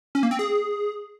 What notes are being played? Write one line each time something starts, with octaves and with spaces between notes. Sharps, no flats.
C#4
A#3
C4
G#4